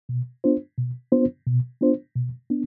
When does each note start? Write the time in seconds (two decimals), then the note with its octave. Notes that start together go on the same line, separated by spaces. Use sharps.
0.09 B2
0.44 B3 D4 F4 C5
0.78 B2
1.12 B3 D4 F4 C5
1.47 B2
1.81 B3 D4 F4 C5
2.16 B2
2.50 B3 D4